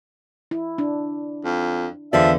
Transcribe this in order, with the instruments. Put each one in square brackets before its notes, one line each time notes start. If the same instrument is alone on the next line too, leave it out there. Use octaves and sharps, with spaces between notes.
[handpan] E4
D4
[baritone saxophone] F2
[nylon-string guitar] E2 D3 D5 [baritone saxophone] F3 [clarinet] E5